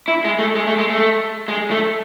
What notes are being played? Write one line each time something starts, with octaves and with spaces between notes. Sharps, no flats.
E4
G#3
A3
G#3
A3
G#3
A3
G#3
A3